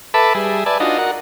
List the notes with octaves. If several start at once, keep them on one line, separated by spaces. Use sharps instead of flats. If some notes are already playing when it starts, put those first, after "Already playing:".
A4 B4 E5 A5 B5 D6
G3 G#4 E5
B4 D5 E5 G#5 A5
D4 D#4 F4 F#4 D#5
F#4 A#4 F#5